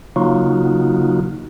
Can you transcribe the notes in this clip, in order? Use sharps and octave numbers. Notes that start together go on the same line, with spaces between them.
C#3 F#3 A#3 D#4 F4 F#4